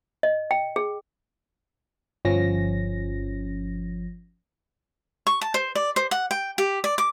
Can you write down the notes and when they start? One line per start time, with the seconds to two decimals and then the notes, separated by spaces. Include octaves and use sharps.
0.23 D#5
0.51 G5
0.76 G#4
2.25 G1 F3 C#4 A#6
5.27 C#6
5.41 A5
5.54 C5
5.75 D5
5.96 C5
6.11 F#5
6.31 G5
6.58 G4
6.84 D5
6.98 D6